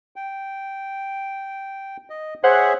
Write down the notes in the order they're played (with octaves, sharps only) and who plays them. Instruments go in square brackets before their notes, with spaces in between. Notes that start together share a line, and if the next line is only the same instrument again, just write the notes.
[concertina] G5
D#5
[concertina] G#4 C#5 E5 [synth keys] C5 F#5